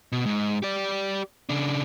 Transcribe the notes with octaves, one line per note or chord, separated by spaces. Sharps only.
B2
G#2
G4 D5
C#3 D4